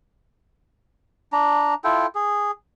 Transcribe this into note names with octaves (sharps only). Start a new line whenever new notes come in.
D4 A#5
E4 F4 A4 G5
G#4